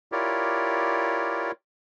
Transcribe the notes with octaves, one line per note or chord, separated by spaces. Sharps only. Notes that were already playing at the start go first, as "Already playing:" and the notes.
E4 F4 G4 A#4 C#5 D5